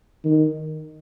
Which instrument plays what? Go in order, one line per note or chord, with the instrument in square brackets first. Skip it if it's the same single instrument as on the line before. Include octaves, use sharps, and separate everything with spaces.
[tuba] D#3